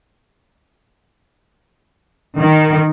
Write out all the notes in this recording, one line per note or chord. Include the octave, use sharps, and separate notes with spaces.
D#3